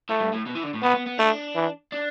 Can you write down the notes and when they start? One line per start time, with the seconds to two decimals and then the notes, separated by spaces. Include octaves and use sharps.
0.09 A2 A3
0.21 G2
0.34 A2
0.46 B2
0.55 E3
0.64 D3
0.74 A2
0.82 B2 B3
0.95 B3
1.06 B3
1.18 A3 D4
1.55 E3
1.92 D4